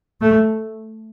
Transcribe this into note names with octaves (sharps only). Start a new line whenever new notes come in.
A3